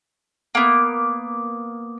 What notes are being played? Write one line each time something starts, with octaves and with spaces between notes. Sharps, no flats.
A#3 B3